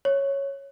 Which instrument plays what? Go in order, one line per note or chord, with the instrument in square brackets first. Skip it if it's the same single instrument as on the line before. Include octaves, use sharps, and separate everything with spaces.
[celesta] C#5